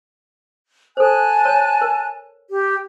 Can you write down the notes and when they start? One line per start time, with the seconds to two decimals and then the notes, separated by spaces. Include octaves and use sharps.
0.97 A4 C5 G#5 A5 F#6
1.45 C#5
1.81 A#4
2.49 G4